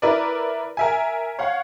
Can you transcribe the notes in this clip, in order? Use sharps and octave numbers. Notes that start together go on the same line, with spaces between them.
E4 A#4 B4 D5
A#4 E5 G#5
C#5 F5 F#5